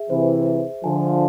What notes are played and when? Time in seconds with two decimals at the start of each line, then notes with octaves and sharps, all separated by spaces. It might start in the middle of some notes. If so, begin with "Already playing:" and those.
Already playing: G#4 E5
0.10 C3 E3 C5
0.46 E5
0.84 D3 F3 G#5